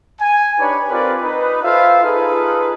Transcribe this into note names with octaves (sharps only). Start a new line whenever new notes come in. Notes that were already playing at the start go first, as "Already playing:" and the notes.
G#5
D4 D#4 G4 B4 C#5 B5
C4 F4 G4 A#4 B4 D5
D#4 B4
F4 A4 B4 C5 E5 F5
D#4 F4 G#4 A4 B4